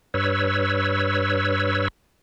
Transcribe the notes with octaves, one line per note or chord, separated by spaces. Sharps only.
G2 B4 C#5 E6